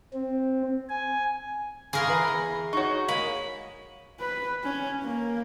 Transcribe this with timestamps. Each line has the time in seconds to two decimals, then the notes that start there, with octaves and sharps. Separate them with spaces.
0.13 C4
0.89 G#5
1.93 C#3 G#4 A#4 F5 C6
2.07 E3 B4
2.28 E2
2.73 D#4 F#4 C#5 C#6
3.08 G#3 A#3 B5
4.20 B4
4.64 C#4
5.03 A#3